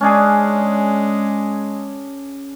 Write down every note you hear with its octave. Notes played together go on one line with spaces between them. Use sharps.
G#3 C#4 D4 G#4